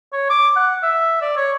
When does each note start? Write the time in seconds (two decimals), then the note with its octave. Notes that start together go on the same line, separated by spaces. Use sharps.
0.13 C#5
0.30 D6
0.57 F#5
0.83 E5
1.22 D5
1.37 C#5